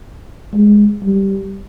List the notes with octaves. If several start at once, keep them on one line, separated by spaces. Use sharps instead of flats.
G#3
G3